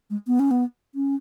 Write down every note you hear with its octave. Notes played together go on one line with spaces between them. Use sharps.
G#3
B3
C#4
B3
C#4